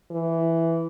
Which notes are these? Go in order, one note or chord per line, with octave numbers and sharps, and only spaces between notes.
E3